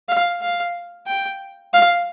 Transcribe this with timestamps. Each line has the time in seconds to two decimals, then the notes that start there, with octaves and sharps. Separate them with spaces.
0.09 F5
0.42 F5
1.07 G5
1.74 F5